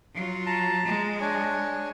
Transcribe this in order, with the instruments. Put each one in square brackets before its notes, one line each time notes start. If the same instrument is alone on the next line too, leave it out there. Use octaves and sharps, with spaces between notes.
[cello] F#3 F4
[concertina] A5 A#5
[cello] G#3
[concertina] D4 C#5 G#5